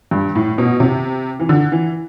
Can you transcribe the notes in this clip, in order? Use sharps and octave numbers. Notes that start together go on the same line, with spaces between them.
G2
A2
B2
C3
E3
D3
E3